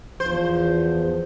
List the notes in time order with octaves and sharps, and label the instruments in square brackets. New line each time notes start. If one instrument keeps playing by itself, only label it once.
[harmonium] E2 F3 [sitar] C5